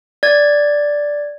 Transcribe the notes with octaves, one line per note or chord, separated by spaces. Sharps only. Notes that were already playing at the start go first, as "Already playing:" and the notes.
D5 G#6